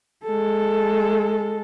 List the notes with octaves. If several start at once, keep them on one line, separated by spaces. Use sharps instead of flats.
G#3 A4